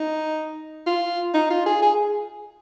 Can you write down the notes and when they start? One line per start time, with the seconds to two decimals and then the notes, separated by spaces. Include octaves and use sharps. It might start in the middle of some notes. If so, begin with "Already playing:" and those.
Already playing: D#4
0.87 F4
1.34 D#4
1.51 F4
1.66 G#4
1.82 G#4